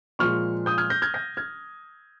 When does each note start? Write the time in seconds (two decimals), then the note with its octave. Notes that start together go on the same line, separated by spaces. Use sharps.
0.19 A#2 F3 G#3 C#6 F6
0.66 D#6 G6
0.78 F6 G#6
0.90 G6 A#6
1.02 F6 G#6
1.14 G6 A#6
1.37 F6 G#6